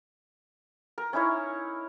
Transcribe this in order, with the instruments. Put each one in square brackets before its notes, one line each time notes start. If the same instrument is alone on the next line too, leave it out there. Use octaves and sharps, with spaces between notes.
[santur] A#4
C#4 D#4 E4 C#5